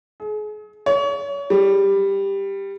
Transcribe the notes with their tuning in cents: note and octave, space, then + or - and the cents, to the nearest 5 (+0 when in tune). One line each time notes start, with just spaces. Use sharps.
G#4 +35
C#5 +30
G3 +10